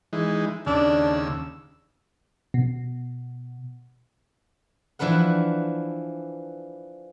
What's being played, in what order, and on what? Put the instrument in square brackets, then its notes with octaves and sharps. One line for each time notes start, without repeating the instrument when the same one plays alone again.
[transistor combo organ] E3 G#3 D#4
[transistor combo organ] D#2 C#3 E6 [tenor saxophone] D4
[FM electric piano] B2
[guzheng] E3 F3 D4 B4 F#5